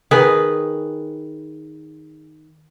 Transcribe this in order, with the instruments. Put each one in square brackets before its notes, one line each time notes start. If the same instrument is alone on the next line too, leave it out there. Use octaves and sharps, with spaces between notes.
[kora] D#3 G#4 B4